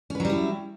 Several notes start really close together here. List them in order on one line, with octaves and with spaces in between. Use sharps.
C#4 B4 F#3 G3 E4